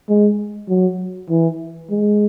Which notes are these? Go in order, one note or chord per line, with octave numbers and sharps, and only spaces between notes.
G#3
F#3
E3
G#3